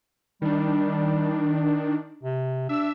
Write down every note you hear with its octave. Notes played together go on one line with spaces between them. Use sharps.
D#3 G3 D4
C3
D4 E5 E6